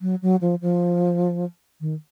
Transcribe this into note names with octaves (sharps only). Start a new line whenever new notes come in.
F#3
F#3
F3
F3
D#3